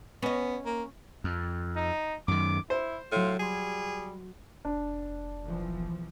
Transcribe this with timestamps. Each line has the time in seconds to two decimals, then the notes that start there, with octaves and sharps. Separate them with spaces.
0.22 B3 C#4 D#5
0.65 A#3
1.24 F2
1.76 D#4
2.28 F#2 D#3 D6
2.70 E4 C5
3.12 A2 F#3 F4 C#7
3.39 G3 G#4 C6 G#6
4.65 F1 D4
5.44 B1 E3 F3